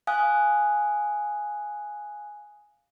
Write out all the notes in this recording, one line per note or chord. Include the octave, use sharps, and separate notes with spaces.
F5 G#5 D#6 F#6